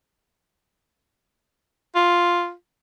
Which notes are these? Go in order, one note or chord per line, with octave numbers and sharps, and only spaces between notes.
F4